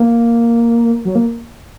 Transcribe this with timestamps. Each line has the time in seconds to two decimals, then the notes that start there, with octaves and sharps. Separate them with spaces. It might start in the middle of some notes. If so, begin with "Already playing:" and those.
Already playing: A#3
1.05 F#3
1.15 A#3